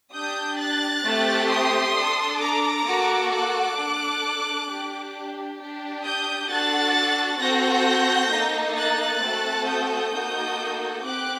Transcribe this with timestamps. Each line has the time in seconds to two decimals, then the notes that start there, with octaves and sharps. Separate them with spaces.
0.14 D4 G4 D#6 G6
0.59 F#6 A6
1.04 A3 C4 G4
1.50 C6 D#6
1.95 D4 A4
2.41 A#5 D6
2.86 A#3 F#4 A4
3.31 D6 F#6
3.77 D4 A4
4.68 D4 G4
5.59 D4 G4
6.04 D#6 G6
6.50 D4 F#4 A4 F#6 A6
7.40 C4 F#4 A4 G6 A#6
8.32 A#3 D#4 A4
8.76 F#6 A6
9.22 A3 C4 F#4 A4
9.68 D#6 G6
10.13 A#3 D#4 F#4 A4
11.04 C4 G4 D6 F#6